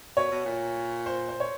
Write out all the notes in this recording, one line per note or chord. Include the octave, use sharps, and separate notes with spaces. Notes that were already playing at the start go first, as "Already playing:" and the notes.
B2 C#5
B2
A#2
C5
C5
C#5